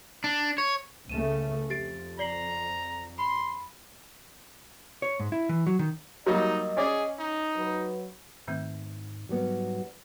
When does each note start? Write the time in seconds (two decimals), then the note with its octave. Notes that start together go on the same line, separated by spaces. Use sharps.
0.24 D4
0.58 C#5
1.09 C#2 C#3 A3 D#7 E7
1.70 F2 G4 A6 D7
2.19 D5 A#5 C7 F#7
3.18 B5 C6
5.02 C#5
5.20 G#2
5.32 E4
5.49 E3
5.67 F#3
5.79 D#3
6.26 F#3 G3 A#3 D#4 D#5
6.77 C#4 G#4 D5
7.19 D#4
7.56 F#3 B4
8.48 G#2 D#3 A3 C4
9.29 G#2 F#3 G3 B3